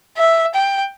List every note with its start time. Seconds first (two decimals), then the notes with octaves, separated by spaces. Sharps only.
0.17 E5
0.54 G5